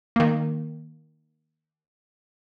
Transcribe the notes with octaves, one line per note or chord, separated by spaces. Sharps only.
D#3 A#3